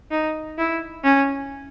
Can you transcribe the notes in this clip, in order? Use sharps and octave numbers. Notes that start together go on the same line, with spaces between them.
D#4
E4
C#4